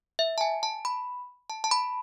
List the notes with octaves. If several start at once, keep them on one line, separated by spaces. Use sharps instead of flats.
E5
A5
G#5
A5
B5
A5
A5
B5